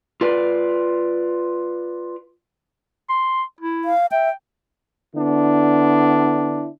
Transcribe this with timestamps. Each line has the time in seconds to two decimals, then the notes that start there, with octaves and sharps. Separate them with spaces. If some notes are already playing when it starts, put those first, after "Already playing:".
0.21 F4 B4 D5
3.10 C6
3.61 E4
3.85 F5
4.12 E5 G5
5.15 D3 B3 D4 E4